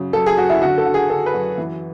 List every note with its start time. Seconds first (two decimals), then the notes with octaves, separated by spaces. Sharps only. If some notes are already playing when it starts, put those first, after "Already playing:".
Already playing: F#2 C#3
0.13 F#2 A4
0.26 G#4
0.37 F#2 F#4
0.50 E4
0.62 D3 F#4
0.78 A4
0.86 D3
0.94 G#4
1.09 D3 A4
1.26 B4
1.34 F#2
1.58 E3